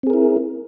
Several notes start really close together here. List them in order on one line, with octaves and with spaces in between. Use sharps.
C4 G#4 A#4 E4